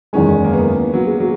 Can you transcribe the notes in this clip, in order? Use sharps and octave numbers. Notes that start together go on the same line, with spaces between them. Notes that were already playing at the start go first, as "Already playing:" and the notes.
F#1 E2 D#3 G#3 C#4
A#3
B3
F#3
G#3
F#3